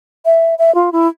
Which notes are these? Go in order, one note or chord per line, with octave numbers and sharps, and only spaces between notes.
E5
E5
F4
E4